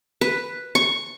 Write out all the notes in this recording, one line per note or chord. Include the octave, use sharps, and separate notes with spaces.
B4
C#6